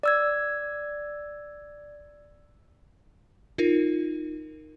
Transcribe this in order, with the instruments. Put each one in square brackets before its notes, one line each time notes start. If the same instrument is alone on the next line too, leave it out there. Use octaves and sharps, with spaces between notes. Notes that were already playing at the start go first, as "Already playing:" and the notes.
[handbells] D5 E6 G#6
[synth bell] D#4 F4 A#4